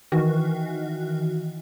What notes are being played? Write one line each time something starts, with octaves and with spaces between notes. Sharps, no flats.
D#3 E3 F#4